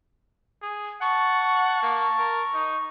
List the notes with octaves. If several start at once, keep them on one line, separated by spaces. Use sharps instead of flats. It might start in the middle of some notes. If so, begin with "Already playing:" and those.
G#4
F#5 A5 C#6
A#3
A#4
D#4